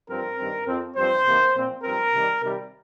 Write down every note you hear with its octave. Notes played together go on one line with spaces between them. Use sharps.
G2 F3 C4 A#4
G2 D#3 C4
F2 F3 C4
G2 F3 C4 C5
C3 D#3 A#3
A#2 F3 C4
G2 F3 C4 A#4
C3 D#3 G3
C3 D#3 G3